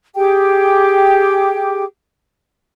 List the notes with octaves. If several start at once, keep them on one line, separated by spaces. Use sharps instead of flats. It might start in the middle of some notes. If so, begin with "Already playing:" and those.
G4 G#4 G5 D6